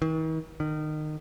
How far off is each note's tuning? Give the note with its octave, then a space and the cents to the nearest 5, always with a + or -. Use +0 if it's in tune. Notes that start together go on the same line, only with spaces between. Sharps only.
D#3 +45
D#3 -25